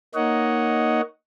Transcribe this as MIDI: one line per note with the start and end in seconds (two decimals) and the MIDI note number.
0.15 1.01 58
0.15 1.01 63
0.15 1.01 73
0.15 1.01 75
0.15 1.01 78